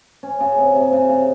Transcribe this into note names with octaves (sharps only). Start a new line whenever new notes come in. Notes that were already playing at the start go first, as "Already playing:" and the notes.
C#4
C#3
C3
C3
C#3
C#3